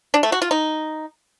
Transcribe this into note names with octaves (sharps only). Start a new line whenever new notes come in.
D4
A3
F#4
F4
D#4